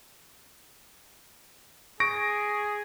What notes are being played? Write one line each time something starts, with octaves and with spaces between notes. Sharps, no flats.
G#4 C#6 A#6 D7